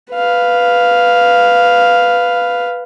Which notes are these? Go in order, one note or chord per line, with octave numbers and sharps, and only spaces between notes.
B4 F5